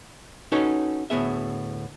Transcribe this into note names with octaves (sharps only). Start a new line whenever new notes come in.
C#4 D#4 F#4 A4 B4 C#5
D2 A2 B3 G#4 E5